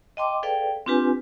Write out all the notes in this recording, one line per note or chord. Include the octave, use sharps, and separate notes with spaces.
D#5 F5 G5 A5 C6 D6
G#4 A4 B4 D5 F5 G5
C4 D4 F4 G4 B4 G#5